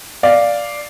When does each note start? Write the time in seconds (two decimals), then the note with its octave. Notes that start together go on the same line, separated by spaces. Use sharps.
0.23 D5 F5